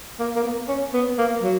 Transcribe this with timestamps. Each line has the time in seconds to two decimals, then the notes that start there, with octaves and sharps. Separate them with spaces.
0.19 A#3
0.35 A#3
0.44 B3
0.69 C#4
0.94 B3
1.18 A#3
1.43 F#3